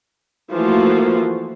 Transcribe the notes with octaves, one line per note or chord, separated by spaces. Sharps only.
E3 F3 A3 A#3 F4 F#4